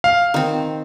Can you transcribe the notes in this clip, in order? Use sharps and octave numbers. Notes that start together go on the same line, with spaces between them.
F5
D#3 C4